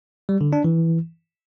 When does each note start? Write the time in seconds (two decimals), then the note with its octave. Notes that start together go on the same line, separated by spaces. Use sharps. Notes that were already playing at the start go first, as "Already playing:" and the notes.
0.29 G3
0.41 D3
0.53 D4
0.64 E3